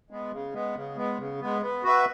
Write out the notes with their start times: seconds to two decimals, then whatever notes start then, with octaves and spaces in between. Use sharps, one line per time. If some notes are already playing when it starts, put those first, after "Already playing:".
0.10 G#3 B3
0.32 C#3
0.54 G#3 B3
0.75 C#3
0.97 G#3 B3
1.19 C#3
1.41 G#3 B3
1.62 B3
1.84 F#4 B4 E5